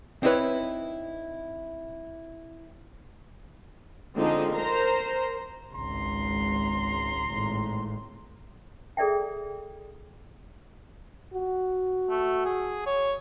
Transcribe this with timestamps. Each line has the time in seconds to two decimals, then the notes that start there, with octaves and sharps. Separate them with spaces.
0.23 C4 D#4 E4 B4 C#5
4.16 D3 F3 G#3 C4 D#4
4.54 A#4 C5 A#5
5.74 G#1 C#2 A#5 C6
7.28 G#1 A2
8.97 G#4 A4 D5 E5 G5
11.34 F#4
12.10 A3
12.45 G#4
12.86 C#5